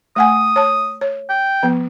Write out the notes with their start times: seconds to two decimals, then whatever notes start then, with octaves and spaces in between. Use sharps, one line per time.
0.16 A3 F#5 G#5 D#6
0.56 C#5 A5
1.01 C#5
1.29 G5
1.63 F3 B3